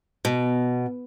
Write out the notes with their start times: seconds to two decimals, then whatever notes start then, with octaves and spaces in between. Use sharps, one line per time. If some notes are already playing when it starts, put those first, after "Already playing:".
0.25 B2